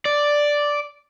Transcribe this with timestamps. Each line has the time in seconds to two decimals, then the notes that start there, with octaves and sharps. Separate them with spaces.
0.05 D5